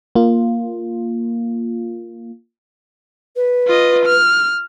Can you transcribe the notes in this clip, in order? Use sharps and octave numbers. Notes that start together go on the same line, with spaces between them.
A#3 F4
B4
F4 D#5
F6